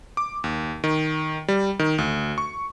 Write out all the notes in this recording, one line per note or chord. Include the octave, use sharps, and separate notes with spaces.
D6
D#2
D#3
G3
D#3
D2
C#6